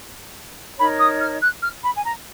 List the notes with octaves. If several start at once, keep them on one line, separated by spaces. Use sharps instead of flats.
D#4 A#4 C#5 B5
D#6
F6
F#6
F6
B5
G#5
A#5